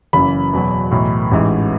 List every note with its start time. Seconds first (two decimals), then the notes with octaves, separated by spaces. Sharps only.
0.13 F#1 F#2 E3 B5
0.53 E2 B2 F#3
0.91 B1 A2 E3
1.32 A1 G#2 E3